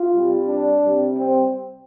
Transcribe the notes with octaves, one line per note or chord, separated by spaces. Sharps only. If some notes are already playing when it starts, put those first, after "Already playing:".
Already playing: F4
C3 G3
D4
C3 G3
C4